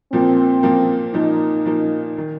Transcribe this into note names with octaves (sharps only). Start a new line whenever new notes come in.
A#2 F3 A#3 C4
A#2 F3 A#3
A#2 F3 A#3 D#4
A#2 F3 A#3
D#3